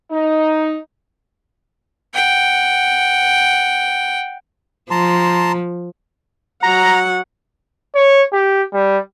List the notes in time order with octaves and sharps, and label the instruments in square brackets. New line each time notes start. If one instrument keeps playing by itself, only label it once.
[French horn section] D#4
[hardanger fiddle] F#5 G5
[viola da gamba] F3 [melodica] A5 A#5 C6
[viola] F#3 F#5 [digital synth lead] A#5
[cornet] C#5
G4
G3